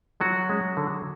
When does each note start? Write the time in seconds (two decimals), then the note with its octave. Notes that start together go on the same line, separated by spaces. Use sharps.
0.20 F3 F#3 F#4
0.49 G#3 C#4
0.77 D3